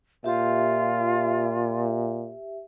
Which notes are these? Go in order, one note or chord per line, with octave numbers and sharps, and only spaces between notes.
A#2 F4 G4 E5